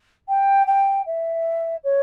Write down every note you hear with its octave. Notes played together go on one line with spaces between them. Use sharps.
G5
G5
E5
C#5